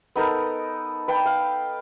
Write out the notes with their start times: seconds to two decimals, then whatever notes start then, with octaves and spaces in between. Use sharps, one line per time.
0.15 B3 D#4 A4 A#4
1.08 B4 G5 A5
1.26 F5